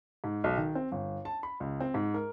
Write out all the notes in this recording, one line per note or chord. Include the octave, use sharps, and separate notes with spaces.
G#2
B1
D#3
C4
G1
A5
B5
C#2
C4
G#2
A#4